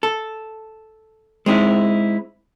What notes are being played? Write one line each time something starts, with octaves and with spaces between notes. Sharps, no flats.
A4
G#3 C4 D#4 E4